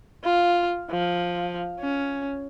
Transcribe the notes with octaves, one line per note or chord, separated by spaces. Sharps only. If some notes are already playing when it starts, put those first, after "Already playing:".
F4
F3
C#4